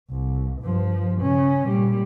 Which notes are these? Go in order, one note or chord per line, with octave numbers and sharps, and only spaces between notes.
C2
G2 F3
C#3 C#4
A#2 G3